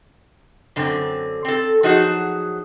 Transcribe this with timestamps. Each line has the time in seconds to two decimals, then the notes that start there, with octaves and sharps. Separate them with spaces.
0.76 F#2 D3 C4
1.45 C4 A4
1.83 F3 F#3 D#4 F#4 G#4